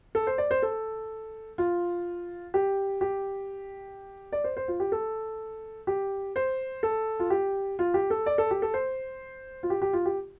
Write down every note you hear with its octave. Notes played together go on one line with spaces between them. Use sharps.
A4
C5
D5
C5
A4
F4
G4
G4
D5
C5
C5
F4
G4
A4
G4
C5
A4
F4
G4
F4
G4
A4
D5
A4
G4
A4
C5
F4
G4
G4
F4
G4